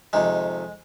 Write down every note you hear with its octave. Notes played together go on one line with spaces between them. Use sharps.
F2 C3 D#3 G#3